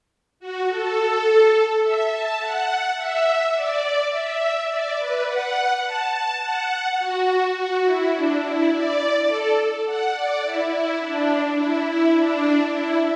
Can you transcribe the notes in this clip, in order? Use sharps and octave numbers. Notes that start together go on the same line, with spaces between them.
F#4
A4
E5
A5
F#5
E5
D5
E5
D5
B4
F#5
A5
A5
F#5
F#4
F#4
E4
D4
E4
D5
A4
F#5
D5
E4
E4
D4
E4
E4
D4
E4